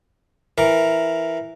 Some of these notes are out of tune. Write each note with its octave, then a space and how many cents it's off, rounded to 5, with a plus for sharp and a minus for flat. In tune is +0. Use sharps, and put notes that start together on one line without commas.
E3 +0 A#4 +0